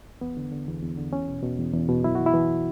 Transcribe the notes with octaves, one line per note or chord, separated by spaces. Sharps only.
E2 B3
D3
D3
E2
E2
D3
E2 C#4
B2
B2
E2
E2
B2
F#2 E4
E3 F#4
E4
E3